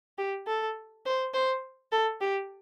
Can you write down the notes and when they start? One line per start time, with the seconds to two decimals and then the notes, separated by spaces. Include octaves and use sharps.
0.18 G4
0.47 A4
1.06 C5
1.34 C5
1.92 A4
2.21 G4